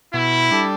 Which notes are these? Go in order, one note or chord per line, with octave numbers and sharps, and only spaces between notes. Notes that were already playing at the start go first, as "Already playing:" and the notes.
B2 E4
G3 D4 A4